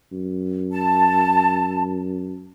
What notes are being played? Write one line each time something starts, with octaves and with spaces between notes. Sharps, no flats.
F#2
A5